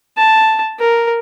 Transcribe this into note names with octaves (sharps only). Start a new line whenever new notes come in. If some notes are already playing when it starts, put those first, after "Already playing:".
A5
A#4